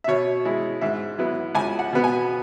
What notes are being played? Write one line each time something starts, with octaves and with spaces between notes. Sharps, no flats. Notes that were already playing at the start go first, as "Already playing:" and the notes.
E5
B2 C#5
G#3 E4
G#2 E5
F#3 B3 E4
C#2 G#5
F#5
B2 B3
G#5